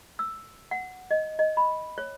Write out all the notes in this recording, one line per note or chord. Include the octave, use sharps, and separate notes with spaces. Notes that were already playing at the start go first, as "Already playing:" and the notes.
E6
F#5
D#5
D#5
B5
C#5